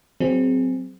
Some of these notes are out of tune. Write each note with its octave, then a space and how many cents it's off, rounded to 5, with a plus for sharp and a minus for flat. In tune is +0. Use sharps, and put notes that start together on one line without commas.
F#3 +0 C4 -15 G#4 +0